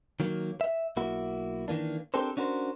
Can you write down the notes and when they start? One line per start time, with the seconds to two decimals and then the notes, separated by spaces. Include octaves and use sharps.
0.20 D#3 F#3 A#3
0.61 E5
0.97 B1 A#3 E4 F#4
1.68 D#3 E3 A#3 D4
2.14 C4 D4 G4 A4 A#4 C5
2.37 C#4 D4 F#4 A#4 C5